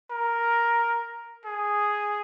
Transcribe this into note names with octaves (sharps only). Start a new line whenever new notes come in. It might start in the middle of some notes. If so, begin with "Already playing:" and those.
A#4
G#4